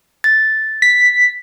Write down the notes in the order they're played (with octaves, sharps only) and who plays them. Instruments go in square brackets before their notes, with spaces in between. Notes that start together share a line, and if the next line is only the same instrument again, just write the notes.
[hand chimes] A6
[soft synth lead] B6